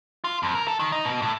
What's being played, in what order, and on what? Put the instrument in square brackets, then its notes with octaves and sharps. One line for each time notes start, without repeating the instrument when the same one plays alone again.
[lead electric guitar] F4
F2
A#4
A4
D#3
D#4
B2
A2